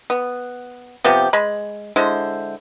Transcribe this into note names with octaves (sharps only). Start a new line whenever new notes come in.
B3
C3 F3 B3 G4
G#3 B5
D3 G#3 E4 C5